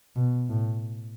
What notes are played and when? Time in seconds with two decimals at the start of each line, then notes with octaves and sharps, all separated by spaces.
0.16 B2
0.49 A2